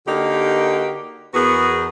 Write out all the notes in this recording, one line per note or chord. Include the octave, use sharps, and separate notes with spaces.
D3 A#3 D#4 F#4 G4 A#4
E2 B3 F#4 G#4 A#4 B4